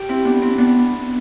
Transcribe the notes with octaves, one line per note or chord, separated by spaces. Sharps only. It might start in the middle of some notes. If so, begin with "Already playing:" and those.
Already playing: G4
C4 E4
B3 D4
C4 E4
B3 D4